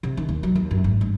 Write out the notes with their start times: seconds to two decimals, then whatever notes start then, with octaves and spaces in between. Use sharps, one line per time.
0.03 C3
0.17 D#3
0.29 D#2
0.43 F#3
0.55 D#2
0.71 F#2
0.84 G#1
1.01 G2